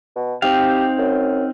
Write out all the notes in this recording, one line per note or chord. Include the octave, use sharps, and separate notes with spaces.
B2
C4 D#4 G4 F5
F#2